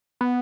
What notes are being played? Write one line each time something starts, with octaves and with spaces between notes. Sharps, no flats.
B3